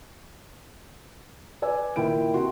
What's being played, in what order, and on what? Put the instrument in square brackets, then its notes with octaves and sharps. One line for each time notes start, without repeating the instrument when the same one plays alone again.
[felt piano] B4 D5 G#5 E6
A#2 D#3 E4 G5 D7
C3 F#4 C6